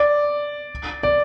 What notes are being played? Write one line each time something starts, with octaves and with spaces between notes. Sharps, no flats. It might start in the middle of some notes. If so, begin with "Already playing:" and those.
Already playing: D5
D5